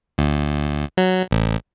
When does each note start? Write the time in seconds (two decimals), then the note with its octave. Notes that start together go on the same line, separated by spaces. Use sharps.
0.18 D2
0.97 F#3
1.31 A1